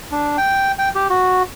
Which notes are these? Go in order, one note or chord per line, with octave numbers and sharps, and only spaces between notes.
D4
G5
G5
G4
F#4